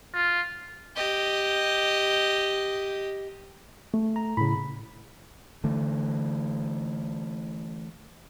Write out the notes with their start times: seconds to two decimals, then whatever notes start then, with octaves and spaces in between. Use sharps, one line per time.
0.14 F4
0.96 G4 D#5
3.94 A3
4.16 A#5
4.37 A2 C#3 B5
5.64 D3 E3 A3